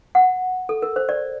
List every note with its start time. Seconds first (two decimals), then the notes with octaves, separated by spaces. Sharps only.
0.15 F#5
0.69 A4
0.82 A#4
0.96 C5
1.09 D5